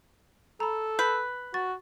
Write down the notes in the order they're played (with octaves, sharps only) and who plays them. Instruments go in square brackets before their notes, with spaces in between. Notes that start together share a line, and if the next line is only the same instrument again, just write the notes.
[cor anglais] A4 [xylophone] A#5 B5
[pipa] B4 [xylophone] G6
[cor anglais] F#4 [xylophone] C#6 A6